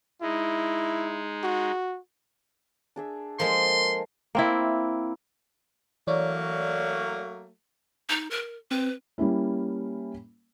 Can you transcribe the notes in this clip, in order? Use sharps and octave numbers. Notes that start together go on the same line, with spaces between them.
G#3 D#4 E4
F#4
D4 G#4 E5
F3 G#3 A#3 A4 A#4 C6
A#3 C4 E4
E3 F#3 A3 A#3 C#5 D5
D#4
A#4
C4 B4
G3 A#3 C#4 E4